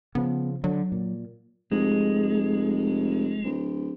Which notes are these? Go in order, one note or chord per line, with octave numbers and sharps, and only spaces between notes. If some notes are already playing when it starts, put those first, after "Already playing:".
C#3 F3 B3
D3 F#3
A#2
F1 G#3
D1